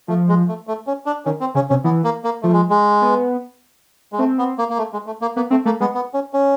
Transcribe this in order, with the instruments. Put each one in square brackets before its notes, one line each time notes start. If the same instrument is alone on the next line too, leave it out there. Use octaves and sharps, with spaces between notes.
[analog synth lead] F3 [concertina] A3
[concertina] G#3
A3
A3
C#4
D4
[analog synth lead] D#3 [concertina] C#4
[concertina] C4
[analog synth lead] C#3 [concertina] C#4
[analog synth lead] C3 [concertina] C#4
[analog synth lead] E3 [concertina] B3
[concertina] A#3
A#3
[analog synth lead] F3 [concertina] A3
[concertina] G#3
G#3
[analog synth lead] B3
[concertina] G#3
[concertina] A3 [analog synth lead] C4
[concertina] B3
A#3
A#3
A3
G#3
A3
A#3
[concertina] A#3 [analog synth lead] B3
[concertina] A3 [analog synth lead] C4
[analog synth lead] A3 [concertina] A#3
[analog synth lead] G#3 [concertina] B3
[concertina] B3
C#4
C#4